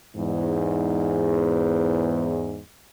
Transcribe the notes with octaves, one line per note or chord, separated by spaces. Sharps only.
E2 G#2